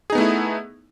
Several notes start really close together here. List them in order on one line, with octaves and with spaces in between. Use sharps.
G#4 D#4 B3 A3 E4